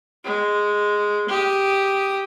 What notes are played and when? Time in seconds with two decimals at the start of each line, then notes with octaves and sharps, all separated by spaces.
0.24 G#3
1.29 G4 D#6